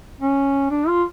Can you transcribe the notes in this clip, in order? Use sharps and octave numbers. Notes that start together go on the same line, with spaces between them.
C#4
D4
F4